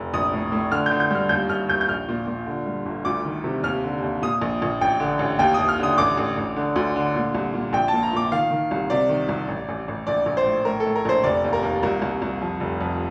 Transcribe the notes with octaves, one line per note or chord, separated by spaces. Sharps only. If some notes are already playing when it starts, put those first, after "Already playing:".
Already playing: F1
A#1 D#6
A2
A2
D3 F6
G6
D3
G6
G2 F6
D#2 G6
D#2 F6
D#2 G6
G6
A#1 F6
A#2
A#2
D3
G2
G1
D2 D6
D#3
C3
D#2 F6
D3
D#2
A#2 D#6
A#1
A#1
A1 G5
D3
A1
D#2 G5
D#2 D#6
F6
D3 D#6
A1 D6
A1
A1
D3
D2
D3
A#2
C2
A#2
A#1 G5
A#2 A5
A#5
A#2 D6
D#3 F5
D#3
C2
C3 D5
D#3
C2
A1
A1
A1
A#1 D5
A#1
C5
A2
A2 A#4
A4
A2
A#4
A#1 C5
F1 D5
D#2
A#4
D#2
C2 A#4
C2
C2
F2
F1
F2